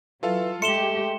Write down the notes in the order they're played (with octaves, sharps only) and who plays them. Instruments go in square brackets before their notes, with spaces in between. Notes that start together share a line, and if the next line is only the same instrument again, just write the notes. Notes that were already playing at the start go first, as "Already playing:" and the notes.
[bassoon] E3 [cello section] F#3 [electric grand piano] F4 A4 F5
[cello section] G#3 G4 [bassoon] A3 [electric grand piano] C6 [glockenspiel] C#7 E7 G7